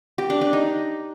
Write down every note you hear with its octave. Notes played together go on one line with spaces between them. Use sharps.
G4
D4
D4
D#4